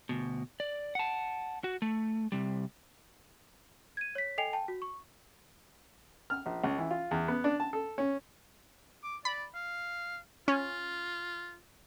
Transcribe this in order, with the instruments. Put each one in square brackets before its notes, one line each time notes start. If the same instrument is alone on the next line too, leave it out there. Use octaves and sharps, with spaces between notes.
[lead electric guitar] D2 B2
D5
F#5 A5
F#4
A3
C3 G3
[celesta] G#6 D#7
C#5 B6
A4 D#5 G5 G#5 C7 F7
G5 A5
F#4
C#6
[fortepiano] F6
A#1
C#2
E3
F4
E2
B3
D4
A5
A4
C#4
[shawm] D6
[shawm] D5 [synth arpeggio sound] B5
[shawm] F5
[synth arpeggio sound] C#4 [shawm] F4